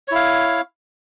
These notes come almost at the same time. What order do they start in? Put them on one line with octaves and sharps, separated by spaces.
C#5 E4 F5